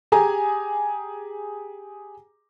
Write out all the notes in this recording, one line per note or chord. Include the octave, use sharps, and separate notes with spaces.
G4 G#4 G#5 A#5